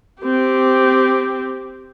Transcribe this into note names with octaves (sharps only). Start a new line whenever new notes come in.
C4 G4